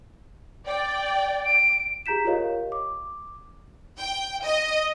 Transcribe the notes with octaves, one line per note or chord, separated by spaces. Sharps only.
D5 G5
D7
G4 G#4 A#5 G6 B6 E7
F4 G4 A#4 C#5 D#5 F5
D6
G5
D#5